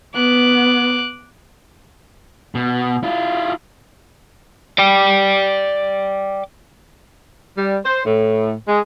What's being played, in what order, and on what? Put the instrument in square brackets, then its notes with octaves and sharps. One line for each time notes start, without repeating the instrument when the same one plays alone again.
[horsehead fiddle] B3 [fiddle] D6 F#6
[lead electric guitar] B2
E4 F4
[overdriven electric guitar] D5 G5
[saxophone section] G3
C5
A2
G#3